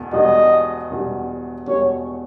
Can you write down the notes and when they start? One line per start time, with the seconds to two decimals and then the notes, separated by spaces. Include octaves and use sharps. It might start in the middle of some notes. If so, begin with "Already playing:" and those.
Already playing: E1 E2 B2
0.13 E1 E2 B2 G3 D#5
0.91 E1 E2 B2 G3
1.67 E1 E2 B2 G3 C#5